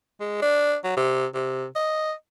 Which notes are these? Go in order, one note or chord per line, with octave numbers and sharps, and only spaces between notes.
G#3
D4
F#3
C3
C3
D#5